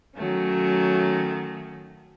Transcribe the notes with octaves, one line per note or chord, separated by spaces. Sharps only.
D#3 F#3 A3 C#4